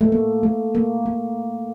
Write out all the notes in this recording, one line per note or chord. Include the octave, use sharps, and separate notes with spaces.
A3
A#3
A3
A#3
A#3